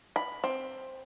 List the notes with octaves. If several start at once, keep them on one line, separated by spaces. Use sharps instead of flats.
B5
C4